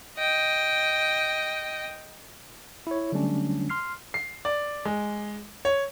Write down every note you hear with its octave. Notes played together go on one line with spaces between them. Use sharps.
D#5 G5
E4 C#5
D3 F#3 G3 A3 C#4 D4
C6 F6 C7
C7
D5
G#3
C#5